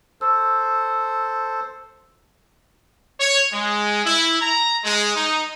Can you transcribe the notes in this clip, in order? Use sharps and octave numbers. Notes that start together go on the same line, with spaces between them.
A4 C5 E6
C#5
G#3
E4
A#5
G#3
D#4